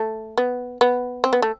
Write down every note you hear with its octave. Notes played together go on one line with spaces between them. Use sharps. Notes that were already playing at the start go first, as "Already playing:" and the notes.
Already playing: A3
B3
B3
C4
B3
A3